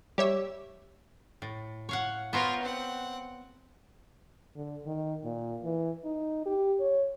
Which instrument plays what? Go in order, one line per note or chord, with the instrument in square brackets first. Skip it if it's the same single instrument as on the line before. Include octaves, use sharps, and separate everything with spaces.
[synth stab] G3 [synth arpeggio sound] G4 C#5 E5
[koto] A2
C#5 F5 F#5
[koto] B3 C5 C#5 [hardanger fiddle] F4 A#4
[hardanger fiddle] C4 F#5
[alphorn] D3
D#3
A#2
E3
D#4
G4
C#5